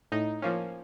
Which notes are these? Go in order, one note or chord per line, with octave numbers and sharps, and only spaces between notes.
A2 D#4
F3 A#3 C#4